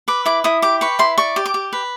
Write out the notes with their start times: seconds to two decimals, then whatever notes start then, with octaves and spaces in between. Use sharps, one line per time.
0.08 B4 D6
0.25 E4 D6
0.44 E4 D#6
0.62 G4 D6
0.81 B4 C#6
0.99 E4 C6
1.18 D5 C#6
1.36 G4
1.46 D6
1.54 G4
1.73 B4